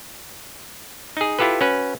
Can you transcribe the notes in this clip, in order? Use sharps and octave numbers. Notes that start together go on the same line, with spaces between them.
D#4 G#4
E4 F4 G4 A4 B4
C#4 F#4 B4